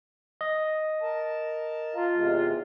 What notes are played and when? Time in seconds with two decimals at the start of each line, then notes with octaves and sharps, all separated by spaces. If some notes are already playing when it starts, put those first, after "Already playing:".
0.41 D#5
1.02 A#4 A5
1.95 F4 F5
2.14 E2 C3 G#3